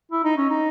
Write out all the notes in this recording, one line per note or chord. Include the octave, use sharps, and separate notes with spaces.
E4
D#4
C#4
D#4